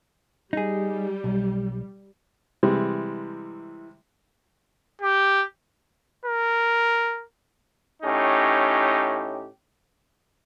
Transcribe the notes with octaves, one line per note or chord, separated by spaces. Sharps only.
G3 D#4 G#4
B1
C3 E3 G3 G#3
G4
A#4
A2 C#4 D#4 G4